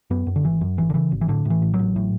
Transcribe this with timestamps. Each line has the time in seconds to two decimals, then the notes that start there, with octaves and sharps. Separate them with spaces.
0.10 F#2 B3
0.27 F#2
0.36 D3
0.44 G#1 E3
0.61 F#2
0.77 G#1 E3
0.90 D3
0.94 C#3 E3
1.12 G#1
1.21 E3
1.28 A2 D3
1.45 A2
1.50 E3
1.62 A1
1.74 F#3
1.79 A1
1.96 A2